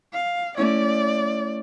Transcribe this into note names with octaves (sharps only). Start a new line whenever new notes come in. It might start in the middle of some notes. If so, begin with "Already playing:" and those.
F5
A3 C#4 E4 D5